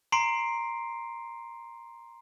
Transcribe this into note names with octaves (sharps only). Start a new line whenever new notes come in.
A#5 C6 C7 D7